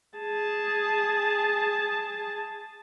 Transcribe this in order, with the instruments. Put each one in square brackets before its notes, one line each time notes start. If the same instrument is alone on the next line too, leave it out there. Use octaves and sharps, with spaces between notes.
[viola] G#4 A5